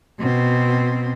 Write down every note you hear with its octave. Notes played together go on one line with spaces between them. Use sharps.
B2 C4